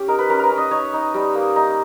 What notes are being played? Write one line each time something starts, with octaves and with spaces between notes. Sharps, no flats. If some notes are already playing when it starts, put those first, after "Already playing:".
Already playing: C#4 G4
D#4 A#4
B4
C#4 A#4
A#4 B4
C#4
D#5
D#4 C#5
D#4
G3
A#3
D#4